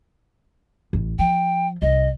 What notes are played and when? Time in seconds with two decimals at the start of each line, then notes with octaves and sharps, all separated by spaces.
0.93 A1
1.19 F3 G5
1.82 C2 D#5